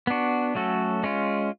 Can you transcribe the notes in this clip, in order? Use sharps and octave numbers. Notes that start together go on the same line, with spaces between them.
B3 D4 F#4
F#3 A3 C#4 F#4 A4
G#3 C#4 F4